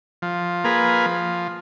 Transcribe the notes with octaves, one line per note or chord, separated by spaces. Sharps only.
F3
A#3 F4 G#4 B4
F3